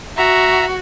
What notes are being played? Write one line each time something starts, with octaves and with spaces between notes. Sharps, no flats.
F#4 E5 A#5